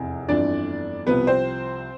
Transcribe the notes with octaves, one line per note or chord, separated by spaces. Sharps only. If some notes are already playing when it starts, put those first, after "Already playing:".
Already playing: F1 E2 C3
G1 F2 E3 D4 D5
C2 C3 F3 B3 B4
C4 C5